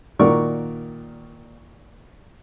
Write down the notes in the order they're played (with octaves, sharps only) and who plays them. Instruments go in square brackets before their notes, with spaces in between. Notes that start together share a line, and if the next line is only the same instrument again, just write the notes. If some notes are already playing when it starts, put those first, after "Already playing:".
[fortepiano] A#2 D#3 F#4 A#4 D5 C#6